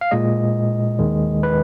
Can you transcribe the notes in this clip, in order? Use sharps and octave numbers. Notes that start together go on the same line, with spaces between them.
F5
A#2 G#3 D#5
D#2 D#3 G#3
B4